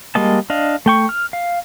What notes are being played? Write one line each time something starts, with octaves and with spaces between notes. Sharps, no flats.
G3 G#3 A#3 D#5 A5
D4 D#5 F5
A3 G5 C#6
F6
F5